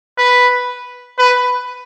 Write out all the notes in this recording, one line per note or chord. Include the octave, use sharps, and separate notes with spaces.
B4
B4